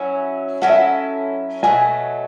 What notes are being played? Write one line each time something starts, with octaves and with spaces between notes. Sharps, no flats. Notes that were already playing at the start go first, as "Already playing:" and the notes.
Already playing: F#3 C#4 E4
F#3 C#4 E4 A4 F#5
E5
F#5
B2 F#3 A3 G#5